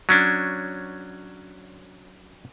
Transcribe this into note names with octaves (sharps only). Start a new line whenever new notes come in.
F#3 C#4 D4